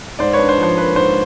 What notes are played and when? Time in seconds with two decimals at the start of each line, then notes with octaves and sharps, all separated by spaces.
0.19 G#2 C5 D5
0.33 B4 C#5
0.39 D4
0.49 C5
0.58 F3
0.63 C5
0.77 A#3 B4
0.96 G#2 C5